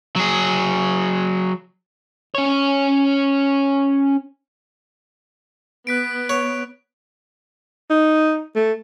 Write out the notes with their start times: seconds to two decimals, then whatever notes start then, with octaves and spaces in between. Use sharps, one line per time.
0.16 F#3 G#4
2.35 C#4 C#5
5.87 B3 F#6 B6 D7
6.29 C#5
7.90 D#4
8.56 A3